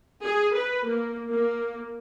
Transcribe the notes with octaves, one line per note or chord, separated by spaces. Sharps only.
G#4
B4
A#3
A#3